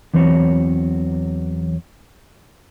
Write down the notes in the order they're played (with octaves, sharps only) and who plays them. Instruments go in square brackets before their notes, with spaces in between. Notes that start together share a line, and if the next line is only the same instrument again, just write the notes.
[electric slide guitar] E2 E3 F#3 C4 C#5